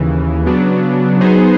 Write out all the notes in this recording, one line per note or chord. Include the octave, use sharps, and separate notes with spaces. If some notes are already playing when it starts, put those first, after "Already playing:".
Already playing: D#2 C#3 E3
C#3 F#3 B3 D4
F#3 B3 D#4 G#4 C5